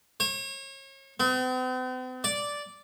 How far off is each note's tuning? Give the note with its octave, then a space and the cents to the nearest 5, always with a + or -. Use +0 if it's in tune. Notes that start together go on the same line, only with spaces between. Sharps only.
C#5 -35
C4 -45
D5 -5